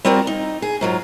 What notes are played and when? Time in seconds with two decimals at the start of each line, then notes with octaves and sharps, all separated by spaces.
0.05 G3 C4 F4 F#4 A#4 D5
0.27 D#4
0.62 G#4
0.81 G#2 F#3 F4